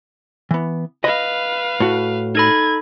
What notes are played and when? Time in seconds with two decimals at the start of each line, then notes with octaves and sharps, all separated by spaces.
0.51 E3 B3
1.04 B4 D#5 F5 B5
1.80 A2 F#4
2.35 D#4 A4 B5 G#6